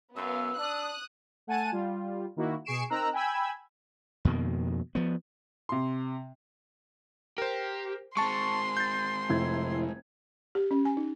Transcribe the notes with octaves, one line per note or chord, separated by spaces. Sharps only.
F#2 B3 F5 E6
D4 D#6 F#6
A3 F#5 G#5 A5 D#7
G3 F4
D#3 A#3 E4 F#4
B2 G#4 C#6 C7 D7 E7
C4 D#4 A#4 A#5 E6 F#6
G5 G#5 B5 E6 G#6
F2 B2 D#3 A#3
F3 B3
C3 C6
G4 A#4 C5
G#3 C4 A5 C6 C#6
G6 A6
F1 E4 G#6
G4
C#4
G#5
D#4